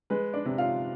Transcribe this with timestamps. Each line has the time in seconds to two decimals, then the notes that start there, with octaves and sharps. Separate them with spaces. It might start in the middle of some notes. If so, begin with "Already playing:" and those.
0.10 G#3 B4
0.33 D4 D5
0.45 C3
0.58 F4 F5